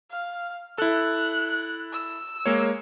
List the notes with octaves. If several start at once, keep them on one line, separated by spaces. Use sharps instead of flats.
F5
E4 A4 F#6
E6
G#3 A#3 C#5